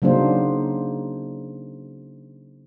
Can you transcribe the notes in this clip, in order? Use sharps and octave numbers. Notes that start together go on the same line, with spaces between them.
C#3 F#3 A#3 D4 D#4 C5